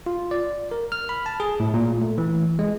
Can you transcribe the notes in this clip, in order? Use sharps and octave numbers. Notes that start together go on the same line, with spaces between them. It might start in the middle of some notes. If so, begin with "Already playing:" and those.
F4
D5
A#4
F6
B5
A5
G#4
A2
A#2
A3
E3
G#3